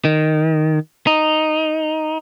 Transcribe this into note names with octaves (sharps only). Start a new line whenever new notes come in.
D#3
D#4